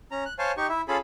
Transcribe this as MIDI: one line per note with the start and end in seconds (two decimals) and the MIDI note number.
0.11 0.24 61
0.11 0.24 82
0.26 0.33 90
0.39 0.52 72
0.39 0.52 73
0.39 0.52 77
0.39 0.52 80
0.39 0.52 81
0.57 0.67 63
0.57 0.67 67
0.57 0.67 85
0.69 0.81 64
0.69 0.81 76
0.88 0.97 61
0.88 0.97 65
0.88 0.97 68
0.88 0.97 69
0.88 0.97 83